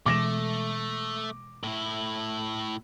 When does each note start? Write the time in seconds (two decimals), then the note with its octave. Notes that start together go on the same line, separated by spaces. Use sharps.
0.06 B2 E3 G#3 A3 D6 A#6 E7
1.63 A2 E4